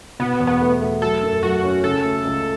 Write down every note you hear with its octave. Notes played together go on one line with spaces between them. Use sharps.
B2 B3
E2
B3
A3
A3
F#3 A4
F#2
F#3 F#4
C#4
C#3 A4
A3
C#2